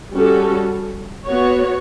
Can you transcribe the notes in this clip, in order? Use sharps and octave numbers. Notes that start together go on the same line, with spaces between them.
G3 C#4 F#4 A4
B3 F#4 C#5